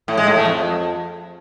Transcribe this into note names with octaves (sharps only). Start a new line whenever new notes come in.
A2
G#3
A2
A3
F2